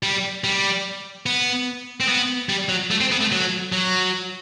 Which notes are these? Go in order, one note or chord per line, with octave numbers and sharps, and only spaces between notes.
G3
G3
B3
C4
B3
G3
F#3
A3
C4
B3
A3
F#3
F#3